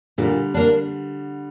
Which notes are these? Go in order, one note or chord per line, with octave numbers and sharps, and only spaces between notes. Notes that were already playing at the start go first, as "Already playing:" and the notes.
A#2 D3 G3
A#3 D4